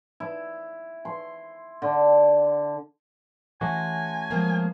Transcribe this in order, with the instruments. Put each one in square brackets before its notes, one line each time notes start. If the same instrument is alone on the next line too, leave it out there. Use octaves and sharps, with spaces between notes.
[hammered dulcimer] E4
C6
D3
[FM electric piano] E3 C6 A#6 [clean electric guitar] A3 C#4 F#4 [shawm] G#5
[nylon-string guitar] F3 G#3 A#3